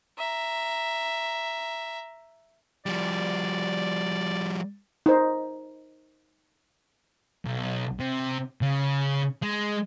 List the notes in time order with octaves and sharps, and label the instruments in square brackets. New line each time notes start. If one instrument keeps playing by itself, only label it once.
[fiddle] E5 A#5
[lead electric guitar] F3 G3 [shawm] D5
[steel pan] D#4 C5
[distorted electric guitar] B1
C3
C#3
G#3